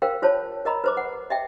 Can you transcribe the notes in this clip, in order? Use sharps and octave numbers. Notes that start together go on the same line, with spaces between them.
A#4 C5 F5 G5
F4 C5 C#5 A5
A#4 D#5 A#5 B5
B4 C5 D6
F#5
D#5 E5 G5